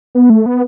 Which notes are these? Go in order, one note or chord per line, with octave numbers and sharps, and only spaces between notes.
B3
A3
B3